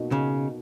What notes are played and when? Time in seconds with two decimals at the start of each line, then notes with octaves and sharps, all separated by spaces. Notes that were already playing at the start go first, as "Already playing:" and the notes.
Already playing: B2 A#3 D#4 F#4
0.12 C#3